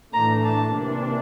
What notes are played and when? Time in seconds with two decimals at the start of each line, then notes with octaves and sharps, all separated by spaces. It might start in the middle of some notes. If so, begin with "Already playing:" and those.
0.13 A2 E3 A3 D4 A#5
0.44 A5
0.73 C3 E3 A#3 D4